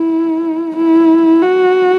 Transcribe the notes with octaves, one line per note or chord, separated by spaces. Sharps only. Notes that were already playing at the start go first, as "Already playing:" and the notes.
Already playing: E4
E4
F#4